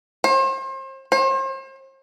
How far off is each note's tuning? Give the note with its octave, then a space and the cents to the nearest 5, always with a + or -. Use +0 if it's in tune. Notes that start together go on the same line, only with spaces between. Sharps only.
C5 +35
C5 +40